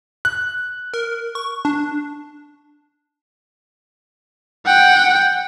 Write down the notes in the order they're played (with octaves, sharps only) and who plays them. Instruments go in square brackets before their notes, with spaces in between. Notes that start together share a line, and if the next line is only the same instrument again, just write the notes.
[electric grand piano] F#6
[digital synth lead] A#4
C#6
D4
[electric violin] F#5 G5